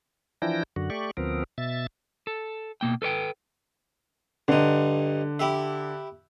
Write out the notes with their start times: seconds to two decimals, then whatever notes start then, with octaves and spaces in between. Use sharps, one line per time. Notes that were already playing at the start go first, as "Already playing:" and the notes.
0.42 E3 F3 D4 E4 G5 A#6
0.76 F#2 D3 F#4
0.90 A3 G4 D5 C#6
1.17 D2 F3 B3 C4 A#4
1.58 B2 E5 A6
2.27 A4
2.81 B2 A#3 G5
3.02 A4 B4 C#5 G5
4.48 G2 D3 D#4
5.39 E4 G4 E5